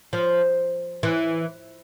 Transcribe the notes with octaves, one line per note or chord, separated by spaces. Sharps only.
F3
E3